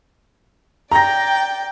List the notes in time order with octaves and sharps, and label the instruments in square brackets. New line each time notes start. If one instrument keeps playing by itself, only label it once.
[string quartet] D5 G5 [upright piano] A#5 A#6